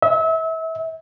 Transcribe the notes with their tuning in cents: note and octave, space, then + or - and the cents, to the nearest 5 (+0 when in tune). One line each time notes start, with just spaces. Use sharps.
E5 -30